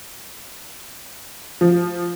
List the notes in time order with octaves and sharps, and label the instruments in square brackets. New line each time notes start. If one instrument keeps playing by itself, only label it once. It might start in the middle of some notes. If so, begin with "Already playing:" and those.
[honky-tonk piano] F3